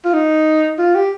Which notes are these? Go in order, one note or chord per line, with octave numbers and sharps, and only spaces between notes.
F4
D#4
F4
G4